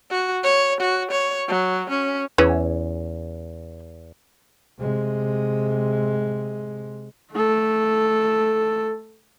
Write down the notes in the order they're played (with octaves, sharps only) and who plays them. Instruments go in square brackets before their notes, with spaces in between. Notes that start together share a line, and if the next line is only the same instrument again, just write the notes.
[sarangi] F#4
C#5
F#4
C#5
F#3
C#4
[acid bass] E2 [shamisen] E3 C#4 G#4
[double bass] C3 G#3
[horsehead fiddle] A3 A4